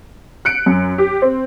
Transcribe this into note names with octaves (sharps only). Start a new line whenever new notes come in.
F#6 C#7 D7
F#2
G4
C4